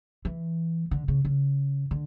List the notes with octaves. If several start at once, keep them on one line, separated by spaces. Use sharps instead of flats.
E3
D3
C#3
C#3
D3